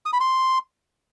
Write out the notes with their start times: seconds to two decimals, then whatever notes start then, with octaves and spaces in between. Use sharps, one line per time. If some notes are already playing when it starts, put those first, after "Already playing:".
0.06 D#6
0.13 B5
0.20 C6